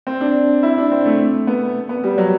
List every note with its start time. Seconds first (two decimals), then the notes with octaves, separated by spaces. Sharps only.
0.07 C4
0.21 D4
0.63 E4
0.78 D4
0.92 C4
1.06 A3
1.47 B3
1.89 B3
2.04 G3
2.18 F#3